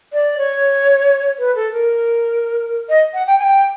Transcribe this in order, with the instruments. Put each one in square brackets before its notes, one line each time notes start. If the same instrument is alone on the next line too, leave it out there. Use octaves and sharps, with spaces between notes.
[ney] D5
C#5
B4
A4
A#4
D#5
F#5
G5
G#5
G5